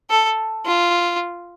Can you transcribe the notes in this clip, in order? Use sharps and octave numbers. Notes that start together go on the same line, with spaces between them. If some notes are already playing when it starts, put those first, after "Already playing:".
A4
F4